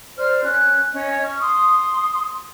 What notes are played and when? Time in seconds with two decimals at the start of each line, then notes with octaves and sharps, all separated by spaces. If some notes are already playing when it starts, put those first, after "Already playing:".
0.18 C5 D5 F6
0.45 C#4 F#6
0.94 C#4 D#5
1.23 C#6 F6
1.42 C6 D#6